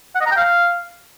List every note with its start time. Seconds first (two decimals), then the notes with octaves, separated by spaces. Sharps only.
0.15 F#5
0.21 D#5
0.26 A#5
0.31 G5
0.37 F5